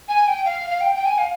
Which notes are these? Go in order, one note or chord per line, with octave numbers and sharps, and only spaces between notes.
G#5
G5
F5
F5
G5
G5
G#5
F5